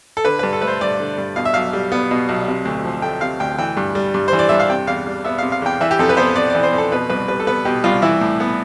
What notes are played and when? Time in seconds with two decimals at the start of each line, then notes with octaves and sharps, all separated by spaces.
0.17 A4
0.25 D3 B4
0.39 G2 B4
0.53 A4
0.62 A3 B4
0.67 C5
0.81 G2 D5
1.00 D3
1.18 G2
1.36 B2 F5
1.45 E5
1.54 B1 F5
1.73 G3
1.92 B3
2.11 B2
2.29 B1
2.48 C3
2.65 D2
2.84 F3
3.02 A3 G5
3.21 C3 F5
3.40 D2 G5
3.58 E3 G5
3.77 G2
3.95 G3
4.14 G2
4.28 E3 C5
4.39 D5
4.49 G2 E5
4.60 F5
4.70 C3 G5
4.87 E2 F5
5.07 G3
5.24 B3 E5
5.38 C3 F5
5.52 F5
5.62 E2 G5
5.81 E3 E5
5.91 G4
5.99 F2 A4
6.09 B4
6.17 B3 C5
6.35 F2 D5
6.50 E3 D5
6.63 C5
6.73 F2
6.78 A4
6.92 B2 B4
7.10 C2 B4
7.28 G3 B4
7.40 A4
7.47 B3 B4
7.65 B2 G4
7.84 C2 F4
8.02 E3 E4
8.21 A2
8.40 B3